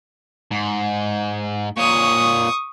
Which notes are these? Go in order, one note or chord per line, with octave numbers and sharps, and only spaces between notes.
G#2
A#2 C#5 C#6 D#6